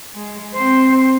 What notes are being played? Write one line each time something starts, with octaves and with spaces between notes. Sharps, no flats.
G#3
C4 C5